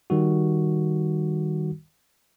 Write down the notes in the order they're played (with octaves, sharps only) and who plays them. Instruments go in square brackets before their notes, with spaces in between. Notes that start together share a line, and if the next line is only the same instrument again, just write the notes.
[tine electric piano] D#3 G3 F#4